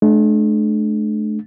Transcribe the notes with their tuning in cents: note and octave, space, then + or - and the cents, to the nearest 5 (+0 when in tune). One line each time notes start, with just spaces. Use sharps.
A3 -40 D4 +20